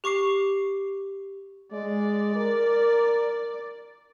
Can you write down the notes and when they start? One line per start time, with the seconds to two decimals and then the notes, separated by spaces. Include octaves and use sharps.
0.04 G4 C#6 D6 C7
1.73 G#3 D5
2.36 A#4